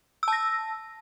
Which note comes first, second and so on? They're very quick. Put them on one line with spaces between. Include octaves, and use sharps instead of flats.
E6 A5 A#6